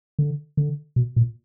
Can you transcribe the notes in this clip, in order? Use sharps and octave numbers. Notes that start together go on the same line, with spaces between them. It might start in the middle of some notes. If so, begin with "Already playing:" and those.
D3
D3
B2
A#2